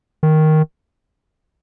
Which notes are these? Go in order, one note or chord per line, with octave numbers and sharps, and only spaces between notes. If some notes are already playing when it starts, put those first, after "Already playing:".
D#3